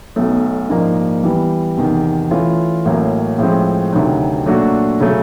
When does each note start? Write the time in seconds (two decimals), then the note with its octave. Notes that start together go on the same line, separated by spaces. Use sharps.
0.16 B1 B2 F#3 A3
0.69 A#1 G#2 F3 A#3 D#4
1.23 E3 G3 B3
1.77 E2 C3 D#3
2.31 E3 A3 C#4 F4
2.85 A1 A2 F#3 A#3
3.38 A2 F3 G#3 C4
3.93 D2 C3 D#3 F#3
4.46 A#2 F#3 A3 D4 F#4
5.00 C#3 F#3 A3